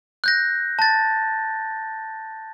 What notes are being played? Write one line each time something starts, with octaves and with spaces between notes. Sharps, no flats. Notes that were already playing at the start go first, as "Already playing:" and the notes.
F#6 G6 A#6
A5 A6